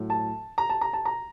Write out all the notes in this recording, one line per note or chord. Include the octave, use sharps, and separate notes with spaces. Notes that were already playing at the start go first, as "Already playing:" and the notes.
Already playing: A2 F#3
A5
A#5
A5
A#5
A5
A#5